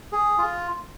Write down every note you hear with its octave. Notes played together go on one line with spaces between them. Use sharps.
G#4
F4